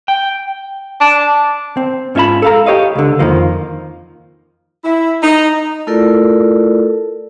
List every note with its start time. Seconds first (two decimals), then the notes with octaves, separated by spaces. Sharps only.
0.08 G5
1.01 D4
1.77 C4
2.15 G#2 C#4 F4 E5 A5 B5
2.42 A4 F5 A#5
2.66 G4 C#5 D#5 F5
2.95 C#2 D3
3.19 F2 D#3 F3 A#3
4.84 E4
5.23 D#4
5.87 A3 E4 F4 A4 A#4 D5